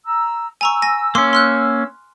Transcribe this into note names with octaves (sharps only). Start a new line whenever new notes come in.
A#5 E6
G#5 A#5 C#6 E6
G#5 A#6
A#3 C#4 C6 D6
C6 F6 F#6